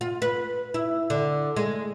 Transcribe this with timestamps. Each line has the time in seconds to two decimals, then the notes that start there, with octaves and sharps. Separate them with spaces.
0.01 F4
0.22 B4
0.74 E4
1.10 D3
1.56 G#3